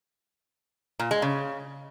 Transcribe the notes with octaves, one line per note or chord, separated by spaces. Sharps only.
A#2
G#3
C#3